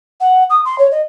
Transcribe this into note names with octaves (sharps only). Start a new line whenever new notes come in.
F#5
D#6
C6
C#5
D#5